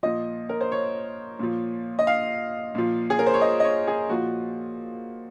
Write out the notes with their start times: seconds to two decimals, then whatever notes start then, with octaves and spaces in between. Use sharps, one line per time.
0.03 A#2 F3 D#5
0.49 A#4
0.61 C5
0.72 C#5
1.39 A#2 F3
1.99 D#5
2.07 F5
2.75 A#2 F3
3.10 G#4
3.19 A#4
3.26 C5
3.34 C#5
3.41 D#5
3.60 D#5
3.64 C#5
3.87 G#4
4.10 A#2 F3 F#4